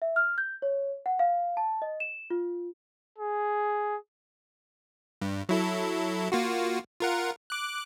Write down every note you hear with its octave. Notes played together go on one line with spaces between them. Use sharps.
E5
F6
G6
C#5
F#5
F5
A5
D#5
E7
F4
G#4
G2
F#3 E4 A4
A#3 F4 F#4
F4 A#4 F#5
D6 F#6